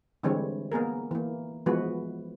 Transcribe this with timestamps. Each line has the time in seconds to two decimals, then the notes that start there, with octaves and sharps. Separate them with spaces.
0.23 D3 E3 G3 G#3 C4 C#5
0.72 A#3 B3 G#4 A#4
1.11 E3 A#3
1.66 E3 F3 G#3 B3 F#4 B4